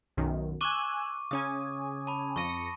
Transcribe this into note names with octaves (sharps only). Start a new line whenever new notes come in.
B1 F#2 D#3
G#5 C#6 D6 E6 F#6 D#7
C#3 C#4 G#5 D#6
A5 B5
F2 C#6 A#6 C#7 D#7